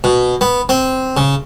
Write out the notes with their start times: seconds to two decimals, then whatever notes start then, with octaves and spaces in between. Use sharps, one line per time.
0.04 B2
0.41 B3
0.69 C4
1.17 C#3